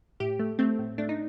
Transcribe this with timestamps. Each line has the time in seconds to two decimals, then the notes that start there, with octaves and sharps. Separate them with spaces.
0.20 A2 G4
0.39 A3
0.59 A3 C4
0.79 A2
0.98 A3 D4
1.09 D#4